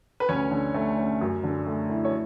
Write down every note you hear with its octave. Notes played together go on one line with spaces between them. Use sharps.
B4
D2 C#4 C#5
D3
A3
C#4
F#2
D3
A3
E4
C#5